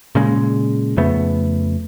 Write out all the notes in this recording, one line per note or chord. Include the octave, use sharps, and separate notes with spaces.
A#2 C#3 G#3
F2 C#3 A3 B3